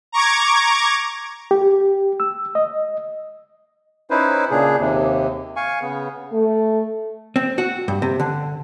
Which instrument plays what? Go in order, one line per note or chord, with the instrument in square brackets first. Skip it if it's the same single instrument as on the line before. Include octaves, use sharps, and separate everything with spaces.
[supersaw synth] A#5 C#6 D6 G#6
[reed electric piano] G4
E6
D#5
[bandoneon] C#4 D#4 E4 B4 C5
A#2 C#3 D4 G#4
D#2 C3
F5 G#5 C#6
C#3 B3
[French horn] A3
[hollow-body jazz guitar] C4
F#4
G2
C3
D3